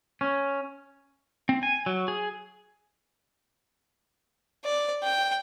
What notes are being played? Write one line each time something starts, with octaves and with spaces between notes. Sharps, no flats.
C#4
C4
G#5
F#3
G#4
D5
G5